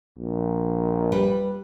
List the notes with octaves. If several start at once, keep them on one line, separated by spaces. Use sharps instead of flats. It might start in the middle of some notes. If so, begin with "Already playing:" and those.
A#1
G3 B4